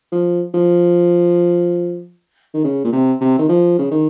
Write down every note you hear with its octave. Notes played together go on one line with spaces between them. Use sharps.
F3
F3
D#3
C#3
A#2
C3
C3
D#3
F3
C#3
D#3